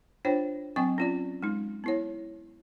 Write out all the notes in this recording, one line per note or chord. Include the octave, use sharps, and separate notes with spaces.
D4 F4 C5 C#5 G5
F#3 C4 D#5 G5 C#6
C#4 F4 D5
G#3 D#4
B3 E4 C#5